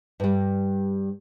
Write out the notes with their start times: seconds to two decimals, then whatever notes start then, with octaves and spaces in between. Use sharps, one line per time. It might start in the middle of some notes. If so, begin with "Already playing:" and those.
0.20 G2 G3